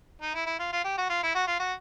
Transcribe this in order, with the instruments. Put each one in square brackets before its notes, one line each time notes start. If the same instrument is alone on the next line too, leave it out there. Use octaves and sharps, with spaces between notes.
[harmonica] D#4
E4
E4
F4
F4
G4
F#4
F4
E4
F#4
F4
F#4